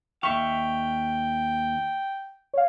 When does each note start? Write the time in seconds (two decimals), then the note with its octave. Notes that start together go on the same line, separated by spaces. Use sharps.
0.23 D#2 E5 F5 G5 C#6
2.54 C#5 F5